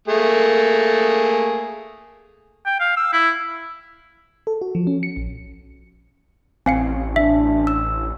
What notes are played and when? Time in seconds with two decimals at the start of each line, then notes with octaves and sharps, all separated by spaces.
0.08 A3 A#3 G#4
2.66 G5
2.80 F5
2.97 E6
3.13 E4
4.47 A4
4.62 F#4
4.75 F3
4.87 C#4
5.03 C#7
5.16 A#1
6.66 A1 C4 F5 G#5 C#7
7.16 D4 E5
7.67 E6